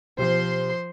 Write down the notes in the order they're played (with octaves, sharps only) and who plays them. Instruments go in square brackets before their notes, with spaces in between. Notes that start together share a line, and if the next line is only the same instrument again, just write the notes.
[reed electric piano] B2 G4 [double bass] F3 [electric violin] C5 C6